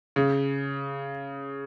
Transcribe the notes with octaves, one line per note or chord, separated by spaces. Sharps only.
C#3